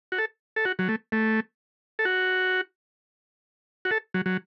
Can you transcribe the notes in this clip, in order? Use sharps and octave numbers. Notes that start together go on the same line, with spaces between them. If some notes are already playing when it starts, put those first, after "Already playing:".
F#4
A4
A4
F#4
F#3
A3
A3
A4
F#4
F#4
A4
F#3
F#3